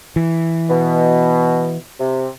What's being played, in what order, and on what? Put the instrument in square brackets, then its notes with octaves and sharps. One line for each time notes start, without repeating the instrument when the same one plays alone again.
[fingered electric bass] E3
[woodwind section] B2
C3